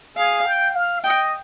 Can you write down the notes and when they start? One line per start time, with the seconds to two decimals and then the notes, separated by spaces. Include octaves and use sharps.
0.16 G#4 F5
0.46 G5
0.75 F5
1.03 D#5 G5